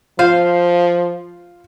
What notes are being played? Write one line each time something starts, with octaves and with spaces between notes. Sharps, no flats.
F3 F4 C5 F5